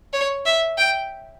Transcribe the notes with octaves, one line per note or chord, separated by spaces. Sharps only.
C#5
E5
G5